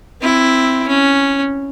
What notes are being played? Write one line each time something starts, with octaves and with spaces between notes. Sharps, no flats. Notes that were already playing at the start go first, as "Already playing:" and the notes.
C4 E4
C#4